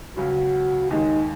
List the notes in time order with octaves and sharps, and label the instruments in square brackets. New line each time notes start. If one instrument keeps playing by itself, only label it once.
[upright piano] C#2 C#3 F#3 C#4 [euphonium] F#4
[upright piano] D#2 D#3 G#3 [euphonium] D#4